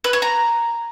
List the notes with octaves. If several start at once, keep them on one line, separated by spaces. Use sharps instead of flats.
B4
C#5
A#5